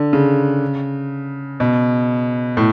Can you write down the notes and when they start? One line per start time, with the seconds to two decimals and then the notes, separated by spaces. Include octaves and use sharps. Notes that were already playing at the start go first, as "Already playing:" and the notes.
Already playing: D3
0.13 C#3
1.60 B2
2.57 A2